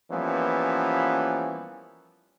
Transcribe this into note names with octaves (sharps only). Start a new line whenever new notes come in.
E3 F3 G3 A#3 B3 C#4